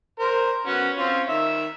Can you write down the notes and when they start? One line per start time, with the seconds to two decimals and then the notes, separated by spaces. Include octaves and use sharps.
0.19 A#4 C5
0.66 B3 C#4 F#4
0.97 C4 C#4 F4
1.28 D#3 E5